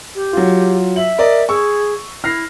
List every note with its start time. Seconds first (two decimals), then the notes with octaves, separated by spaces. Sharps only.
0.15 G4
0.33 F#3 F4
0.96 E5 F#7
1.18 A#4 D5 D#5
1.49 G#4 C#6 E6
2.24 E4 F6 A#6 C7